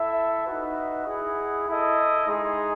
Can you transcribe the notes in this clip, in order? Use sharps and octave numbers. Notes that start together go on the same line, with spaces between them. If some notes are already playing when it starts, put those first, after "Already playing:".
Already playing: E4 A4 E5
D#4 F#4 B4 E5
E4 G#4 D#5 F#5
E4 A4 D#5
G#3 D#4 G#4